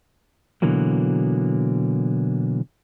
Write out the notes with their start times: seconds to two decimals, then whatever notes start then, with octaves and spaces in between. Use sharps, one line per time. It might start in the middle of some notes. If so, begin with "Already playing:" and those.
0.62 B2 D3 E3 F#3 A#3